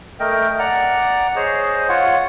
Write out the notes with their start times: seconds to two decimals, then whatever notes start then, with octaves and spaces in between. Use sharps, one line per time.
0.20 A3 A#4 D#5 G5
0.59 D5 F#5 A#5
1.36 G#4 C5 C#5 D#5
1.89 F4 C#5 F#5